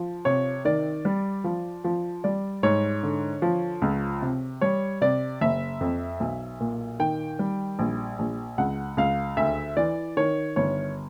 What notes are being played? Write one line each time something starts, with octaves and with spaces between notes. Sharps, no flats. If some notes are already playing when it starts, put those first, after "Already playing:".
Already playing: F3
C3 C#5
D#3 D5
G3
F3
F3
G3 D5
G#2 C#5
D3
F3
C#2
C3
G3 C#5
C3 D5
F#1 E5
F2
B1
A#2
D#3 G5
G3
A#1
A#1
C#2 F#5
C#2 F5
D2 E5
E3 D5
D#3 C#5
G1 C#5